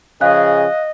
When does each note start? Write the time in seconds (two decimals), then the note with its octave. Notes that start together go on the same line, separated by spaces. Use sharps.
0.21 C#3 F3 G#4 D#5 F5 F#6